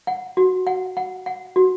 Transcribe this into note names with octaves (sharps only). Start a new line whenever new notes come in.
F#5
F#4
F#5
F#5
F#5
F#4